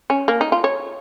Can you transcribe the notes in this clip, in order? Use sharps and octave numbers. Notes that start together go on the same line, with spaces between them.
C#4
A#3
D#4
F4
C#5